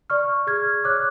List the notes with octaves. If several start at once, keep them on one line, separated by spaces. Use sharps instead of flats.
D5 C#6 F6
G#4 F6 G#6
C#5 D6 F#6